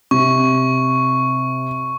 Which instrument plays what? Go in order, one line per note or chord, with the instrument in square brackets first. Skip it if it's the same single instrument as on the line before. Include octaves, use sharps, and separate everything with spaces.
[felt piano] C3 [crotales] C#6